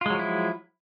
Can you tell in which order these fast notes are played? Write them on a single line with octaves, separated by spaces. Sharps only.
F4 G#3 F#3 F3 E4